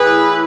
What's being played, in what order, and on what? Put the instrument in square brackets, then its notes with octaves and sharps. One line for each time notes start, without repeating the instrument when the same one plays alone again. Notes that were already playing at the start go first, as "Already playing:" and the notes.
Already playing: [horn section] A2 E3 G#4 B4